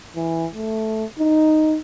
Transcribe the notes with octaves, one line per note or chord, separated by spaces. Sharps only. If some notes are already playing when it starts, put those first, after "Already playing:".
E3
A3
D#4